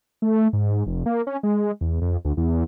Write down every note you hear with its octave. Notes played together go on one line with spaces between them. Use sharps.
A3
G#2
F1
A#3
C#4
G#3
E2
F2
D2
E2